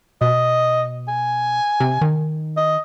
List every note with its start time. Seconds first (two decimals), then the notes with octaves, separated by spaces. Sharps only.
0.21 B2 D#5
1.08 G#5
1.80 C3
2.01 D#3
2.57 D#5